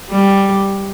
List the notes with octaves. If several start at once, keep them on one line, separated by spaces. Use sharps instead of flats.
G3